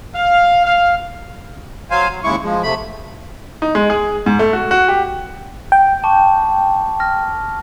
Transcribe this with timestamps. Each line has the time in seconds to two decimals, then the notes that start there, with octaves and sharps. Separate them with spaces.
0.16 F5
0.65 F5
1.91 F#3 C5 F5 G#5
2.09 F#3
2.24 D#2 C#3 G#3 E4 C#6
2.42 F3 G#3
2.63 C3 A3 B5
3.62 D#4
3.75 G#3
3.90 G#4
4.26 G#2
4.39 A3
4.53 F#4
4.71 F#4
4.88 G4
5.72 G5
6.04 A5 C#6 D6
7.00 F6 A#6